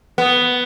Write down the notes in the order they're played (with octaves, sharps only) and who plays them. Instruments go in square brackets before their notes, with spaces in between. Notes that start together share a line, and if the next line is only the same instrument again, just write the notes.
[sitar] B3